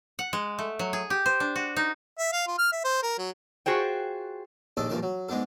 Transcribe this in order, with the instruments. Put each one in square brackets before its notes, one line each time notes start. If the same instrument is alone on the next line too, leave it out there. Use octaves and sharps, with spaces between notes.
[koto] F#5
G#3
A3
F#3
G#4
G4
C5
D4
F#4
D#4
[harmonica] E5
F5
F4
F6
E5
C5
A#4
F#3
[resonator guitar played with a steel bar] F4 F#4 G#4 C5 G5
[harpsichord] A#1 D#2 D4 A4 D#5 A5
A#1 G2 F3 A#4 D5 A5
F#3
G#2 G#3 B3 D4 A4